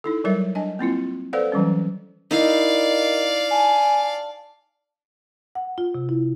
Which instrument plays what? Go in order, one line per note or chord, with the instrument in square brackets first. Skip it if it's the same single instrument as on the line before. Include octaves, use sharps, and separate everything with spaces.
[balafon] D#4 E4 A4
F#3 G3 A#4 C#5 E5
D4 D#5 G#5
A#3 C4 E4 F4
A4 B4 C5 D5 F5 F#5
E3 F#3 G3 C#4
[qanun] D#4 E4 [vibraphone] A#4 D#5 [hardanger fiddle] D5 F5
[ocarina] G#5 [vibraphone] A5
[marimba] F#5
F4
C3
E4